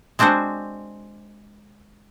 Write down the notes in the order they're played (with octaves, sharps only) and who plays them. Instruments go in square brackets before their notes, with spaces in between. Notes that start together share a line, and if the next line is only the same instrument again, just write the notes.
[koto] G#3 C4 D4 F#4 C5